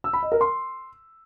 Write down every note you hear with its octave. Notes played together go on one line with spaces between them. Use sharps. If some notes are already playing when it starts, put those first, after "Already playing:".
E6
B5
D#5
A#4
C6